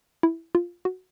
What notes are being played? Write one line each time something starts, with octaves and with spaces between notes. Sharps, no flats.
E4
F4
F#4